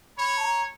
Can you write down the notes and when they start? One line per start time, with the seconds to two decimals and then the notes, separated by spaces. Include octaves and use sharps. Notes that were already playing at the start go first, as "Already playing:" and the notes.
0.18 C#5 B5
0.38 A5
0.44 A#5